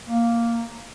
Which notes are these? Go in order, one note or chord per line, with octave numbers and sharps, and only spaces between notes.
A#3